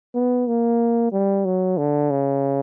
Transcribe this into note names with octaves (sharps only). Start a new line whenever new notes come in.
B3
A#3
G3
F#3
D3
C#3